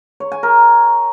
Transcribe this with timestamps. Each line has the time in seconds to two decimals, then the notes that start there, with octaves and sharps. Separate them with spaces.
0.20 C#5
0.32 G#5
0.43 A#4